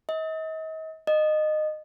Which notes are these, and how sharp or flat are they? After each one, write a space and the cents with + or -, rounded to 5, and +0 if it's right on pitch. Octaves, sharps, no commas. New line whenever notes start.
D#5 +40
D#5 -20